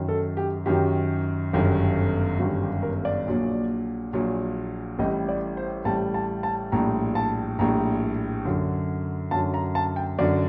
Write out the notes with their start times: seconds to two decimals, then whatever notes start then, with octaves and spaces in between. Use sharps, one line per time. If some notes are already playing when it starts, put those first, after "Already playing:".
Already playing: F#2 D#3 F#3
0.08 A4
0.37 G4
0.66 F#2 D#3 F#3 G4
1.53 G1 F#2 D#3 G3
2.39 G1 F#2 D#3 G3 F#4
2.62 G4
2.83 A#4
3.05 D5
3.26 A#1 A#2 F#3
4.13 A#1 A#2 F#3
4.99 A1 A2 G3 D#5
5.29 D5
5.57 C5
5.85 A1 A2 G3 A5
6.14 A5
6.43 A5
6.72 A#1 A2 G3 A#5
7.15 A5
7.59 A#1 A2 G3 A#5
8.45 F#2 D3 F#3
9.31 F#2 D3 F#3 A5
9.54 A#5
9.75 A5
9.96 G5
10.18 F#2 D3 F#3 D5